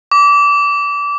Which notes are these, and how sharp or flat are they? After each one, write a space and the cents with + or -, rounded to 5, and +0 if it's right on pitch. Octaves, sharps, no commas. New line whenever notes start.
D6 -25